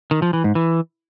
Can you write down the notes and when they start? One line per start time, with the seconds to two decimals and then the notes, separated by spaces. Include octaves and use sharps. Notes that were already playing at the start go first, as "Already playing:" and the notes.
0.11 D#3
0.22 F3
0.33 E3
0.44 G#2
0.55 E3